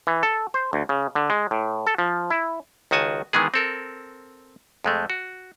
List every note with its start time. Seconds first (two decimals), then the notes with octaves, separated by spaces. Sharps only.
0.07 E3
0.23 A4
0.54 C5
0.73 D2
0.89 C#3
1.15 D3
1.30 G#3
1.51 A2
1.87 A4
1.98 F3
2.30 E4
2.91 C#2 D#3 F#4 G#5 A5
3.33 D#3 E3 G#3 B3 G#4
3.54 C4 A4 A#4
4.84 F2 G#3 A3
5.10 F#4